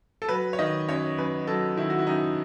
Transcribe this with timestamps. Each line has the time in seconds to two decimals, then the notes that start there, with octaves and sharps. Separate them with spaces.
0.22 A4
0.29 F#3 B4
0.53 C#5
0.59 D#3 D#5
0.88 F#2 C#5
1.18 F#2 B4
1.47 F#3 A4
1.77 D#3 E4
1.90 F#4
1.98 E4
2.07 F#2 D#4